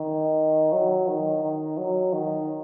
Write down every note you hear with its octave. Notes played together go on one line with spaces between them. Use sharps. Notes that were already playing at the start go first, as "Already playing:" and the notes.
Already playing: D#3
F#3
D#3
D#3
F#3
D#3